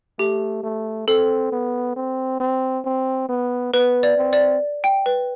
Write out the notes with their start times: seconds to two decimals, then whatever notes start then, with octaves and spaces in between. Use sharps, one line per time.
0.19 A3 G4
0.63 A3
1.07 C4 A4
1.52 B3
1.96 C4
2.40 C4
2.85 C4
3.29 B3
3.73 B3 B4
4.03 D5
4.18 C4
4.33 D5
4.84 G5
5.06 B4